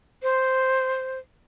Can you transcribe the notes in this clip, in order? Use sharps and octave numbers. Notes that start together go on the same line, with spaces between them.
C5